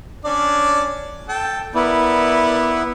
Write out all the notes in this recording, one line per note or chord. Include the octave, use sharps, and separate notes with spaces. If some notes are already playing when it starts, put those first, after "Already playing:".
C#4 D4 D5
A4 G5 A5
B3 E4 A#4 D5